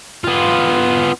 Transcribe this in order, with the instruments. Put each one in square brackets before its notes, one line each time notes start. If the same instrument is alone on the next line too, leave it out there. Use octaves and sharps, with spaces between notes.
[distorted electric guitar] B3 F4